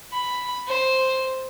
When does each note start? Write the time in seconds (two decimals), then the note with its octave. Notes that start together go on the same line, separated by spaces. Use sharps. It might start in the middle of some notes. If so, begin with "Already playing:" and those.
0.13 B5
0.68 C5